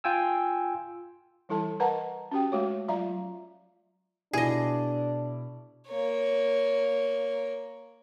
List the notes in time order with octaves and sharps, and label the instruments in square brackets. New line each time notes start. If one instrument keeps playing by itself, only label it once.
[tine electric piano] F4 G5 G#5 E6
[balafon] E3 G3 E4 A4 A5
A#4 B4 D#5 F#5 A5 A#5
C#4 F#4 G4 G5
G#3 A3 F#4 C#5
F#3 F4 E5 F5 A#5
[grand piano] B2 E4 [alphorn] D4 [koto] G#4 D#5
[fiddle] A#3 C#5